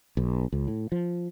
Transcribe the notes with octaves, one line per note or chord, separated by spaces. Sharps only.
B1
C#2
A2
F3